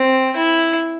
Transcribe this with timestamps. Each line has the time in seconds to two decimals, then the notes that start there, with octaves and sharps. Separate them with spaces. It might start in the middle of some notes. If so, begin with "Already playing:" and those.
Already playing: C4
0.36 E4